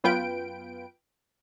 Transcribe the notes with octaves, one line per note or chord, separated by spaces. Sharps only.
F#2 B3 F4 B4 G5 D7